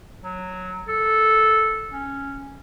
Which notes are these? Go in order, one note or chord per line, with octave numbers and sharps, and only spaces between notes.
F#3
A4
C#4